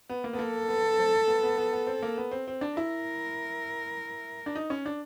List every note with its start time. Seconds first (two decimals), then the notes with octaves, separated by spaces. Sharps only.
0.09 B3
0.24 A#3
0.33 B3
0.39 A#3 A4
0.68 B3
0.98 C4
1.27 B3
1.43 B3
1.58 B3
1.73 B3
1.87 C4
2.03 A#3
2.17 B3
2.31 C4
2.48 C4
2.61 D4
2.76 E4 A#4
4.46 D4
4.55 D#4
4.70 C#4
4.86 D4